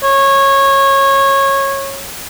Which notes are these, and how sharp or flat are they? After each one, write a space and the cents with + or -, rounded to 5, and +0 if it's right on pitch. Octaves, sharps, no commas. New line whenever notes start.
C#5 -20